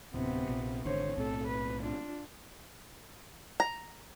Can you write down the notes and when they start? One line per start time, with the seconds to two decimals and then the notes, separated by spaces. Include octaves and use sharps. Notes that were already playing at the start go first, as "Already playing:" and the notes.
0.14 D1 C3 B3
0.49 A#1
0.85 G#1 D3 C5 C#5
1.17 B1 A2 C4 A4
1.48 B4
1.82 D4 F4
3.60 A#5